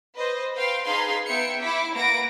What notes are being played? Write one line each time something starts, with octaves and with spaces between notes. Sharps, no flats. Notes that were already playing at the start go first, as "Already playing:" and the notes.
B4 C5 D#5
B4 F5 G5 C6
D#4 G#4 B4 F5 B5 C6
B3 E5 G5 C#7
E4 D6 B6
A#3 B4 F#5 A#6 D7